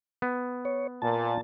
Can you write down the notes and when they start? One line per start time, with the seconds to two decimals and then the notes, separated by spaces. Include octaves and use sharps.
0.22 B3
0.65 C#5
1.02 A#2 A5